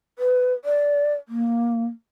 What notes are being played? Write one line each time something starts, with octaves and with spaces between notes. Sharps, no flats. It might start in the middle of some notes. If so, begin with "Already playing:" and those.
B4
D5
A#3